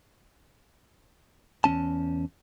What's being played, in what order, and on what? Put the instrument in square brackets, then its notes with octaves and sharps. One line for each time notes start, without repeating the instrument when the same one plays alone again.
[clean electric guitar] E2 F3 C#4 A5